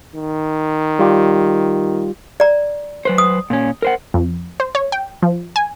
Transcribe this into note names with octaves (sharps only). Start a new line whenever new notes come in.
D#3
G3 F4 G4
D5 A#5
F#3 B4 C5
D#6
A#2 C#4
A#4 C5 F#5
F2
C5
C#5
G5
F3
G#5